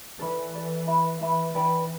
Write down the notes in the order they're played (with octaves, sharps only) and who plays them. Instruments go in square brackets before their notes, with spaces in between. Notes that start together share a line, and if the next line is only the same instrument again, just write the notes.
[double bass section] E3 [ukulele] A4 D5 B5
[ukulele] A4 D5 B5
E4 B4 E5 B5
[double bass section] E3 [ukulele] E4 B4 E5 B5
[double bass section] E3 [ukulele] D4 B4 G5 B5